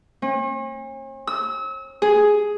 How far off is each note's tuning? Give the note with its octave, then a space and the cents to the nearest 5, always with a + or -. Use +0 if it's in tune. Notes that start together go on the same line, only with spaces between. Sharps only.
C#4 -45
E6 -35
G#4 +5